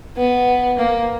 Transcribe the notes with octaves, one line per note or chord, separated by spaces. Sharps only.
B3
A#3